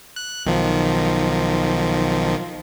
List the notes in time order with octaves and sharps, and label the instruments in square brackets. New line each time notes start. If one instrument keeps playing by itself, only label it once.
[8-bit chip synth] F#6
B1 D#3 F3